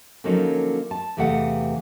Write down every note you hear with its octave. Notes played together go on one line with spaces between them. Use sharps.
D3 F3 F#3 A#3 C#4 D#4
A5
E2 C3 E3 A3 F5 F#5